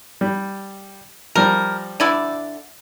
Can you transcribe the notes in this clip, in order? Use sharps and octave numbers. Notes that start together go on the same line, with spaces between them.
G3
F3 G3 A#4
D3 E4 D5